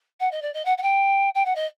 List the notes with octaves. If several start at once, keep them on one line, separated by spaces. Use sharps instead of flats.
F#5
D#5
D5
D#5
F#5
F#5
G5
G5
F#5
D#5